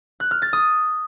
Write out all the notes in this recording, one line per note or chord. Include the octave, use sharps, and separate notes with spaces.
F#6
F6
A6
D#6